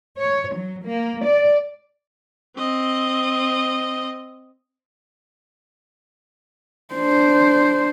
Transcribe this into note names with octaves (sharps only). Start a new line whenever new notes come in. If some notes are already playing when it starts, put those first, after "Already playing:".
C#5
F#3
A#3
D5
C4 D#5
D4 C5